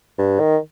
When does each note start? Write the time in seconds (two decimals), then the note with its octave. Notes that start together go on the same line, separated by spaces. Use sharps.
0.18 G2
0.40 D#3